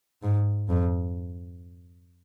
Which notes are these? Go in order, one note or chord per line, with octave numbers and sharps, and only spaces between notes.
G#2
F2